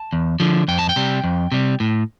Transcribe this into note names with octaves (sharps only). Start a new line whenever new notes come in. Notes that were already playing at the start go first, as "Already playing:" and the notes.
Already playing: A5
E2
D3 F3
F2 G5
A5
G5
C3 G3
F2
C3 G3
A2